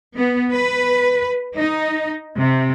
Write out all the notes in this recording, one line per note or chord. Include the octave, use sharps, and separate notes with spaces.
B3
B4
D#4
C3